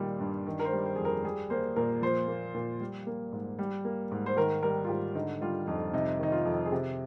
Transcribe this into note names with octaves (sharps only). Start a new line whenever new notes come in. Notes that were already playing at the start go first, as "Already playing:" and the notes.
Already playing: A#2 D#3 G3
G2
D#3
A#4
C5
G3
C5
F2 G#4
A#4
G3 G#4
A#3 C5
A#2 A#4
F3 C5
A#3
A#2
G3
A#3
G#2
G3
A#3
G#2
C5
D#3 A#4
G3 A#4
F4
G#2 G4
D3 D#4
G3 F4
F2 D#4
C3 D#4
D#3 D#4
F4
F2
G#4
C3 G4